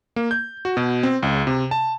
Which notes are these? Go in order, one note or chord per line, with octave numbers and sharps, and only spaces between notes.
A#3
G6
F#4
B2
C4
C#2
C3
A5